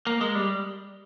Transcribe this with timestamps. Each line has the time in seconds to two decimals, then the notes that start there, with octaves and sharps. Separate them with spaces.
0.07 A#3
0.21 G#3
0.35 G3